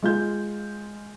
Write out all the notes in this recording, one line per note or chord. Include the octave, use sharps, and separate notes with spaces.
G#3 F4 G6